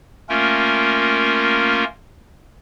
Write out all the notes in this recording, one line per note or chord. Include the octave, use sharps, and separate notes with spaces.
A3 A#3 C#4 F4 A#4